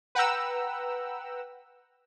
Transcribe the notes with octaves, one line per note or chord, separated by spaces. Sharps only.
B4 F#5 G5 A#5 E6